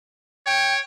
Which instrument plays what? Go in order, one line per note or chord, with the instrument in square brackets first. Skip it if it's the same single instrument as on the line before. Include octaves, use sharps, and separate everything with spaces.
[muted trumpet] C#5 [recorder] G5